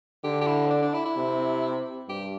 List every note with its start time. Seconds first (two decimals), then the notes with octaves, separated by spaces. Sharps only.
0.24 D3 G4
0.41 G4
0.47 E4
0.66 C4
0.70 D4
0.82 D4
0.93 E4
1.05 E4
1.17 C3
2.08 G2 G4